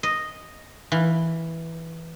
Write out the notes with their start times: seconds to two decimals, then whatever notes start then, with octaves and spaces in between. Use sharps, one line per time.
0.03 D#5
0.92 E3